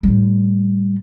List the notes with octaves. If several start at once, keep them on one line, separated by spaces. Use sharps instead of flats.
A2 G3